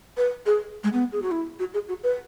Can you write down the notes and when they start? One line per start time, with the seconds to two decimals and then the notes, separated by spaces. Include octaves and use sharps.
0.17 B4
0.46 G#4
0.84 G#3
0.93 B3
1.12 G#4
1.22 F#4
1.31 E4
1.59 F#4
1.74 G#4
1.88 F#4
2.03 B4